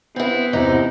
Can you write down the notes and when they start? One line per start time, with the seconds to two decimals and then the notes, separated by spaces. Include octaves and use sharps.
0.16 B3 C4 E4
0.53 E2 C3 D#4